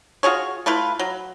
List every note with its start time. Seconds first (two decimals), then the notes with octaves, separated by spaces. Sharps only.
0.23 F4 F#4 G#4 C#5
0.66 A3 E4 F4 B4
0.99 F#3